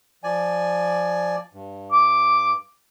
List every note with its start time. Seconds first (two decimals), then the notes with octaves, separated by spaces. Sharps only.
0.24 F3 D5 G#5
1.53 G2
1.92 D6